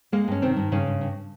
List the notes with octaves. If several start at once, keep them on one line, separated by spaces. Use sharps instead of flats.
G#3 A#3
G2 C#4
C3 D#3 C4
G2
G2 C#3 C#4
G2
G2